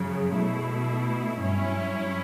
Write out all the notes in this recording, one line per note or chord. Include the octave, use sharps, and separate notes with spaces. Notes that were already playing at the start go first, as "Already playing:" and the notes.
Already playing: F#2 C#3 F#3
B2 A3 E4
G2 F#3 C#4 E4